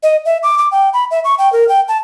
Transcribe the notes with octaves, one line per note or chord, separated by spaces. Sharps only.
D#5
E5
D6
D6
G5
B5
E5
C#6
G5
A#4
G5
A5